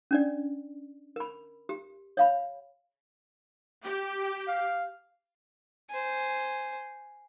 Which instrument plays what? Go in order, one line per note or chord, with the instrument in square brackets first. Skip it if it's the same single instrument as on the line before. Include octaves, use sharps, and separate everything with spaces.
[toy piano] C#4 D4 D5
A#4 B5
G4
C#5 F5 B5
[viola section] G4
[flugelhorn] F5
[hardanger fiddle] C5 G#5